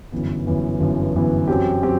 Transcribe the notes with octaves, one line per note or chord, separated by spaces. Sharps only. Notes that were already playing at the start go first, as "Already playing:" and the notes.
G1 F#2 E3 B3
G1 F#2 E3 B3
G1 F#2 E3 B3
G1 F#2 E3 B3
F#2 F#3 C4 G4
F#3 C4 G4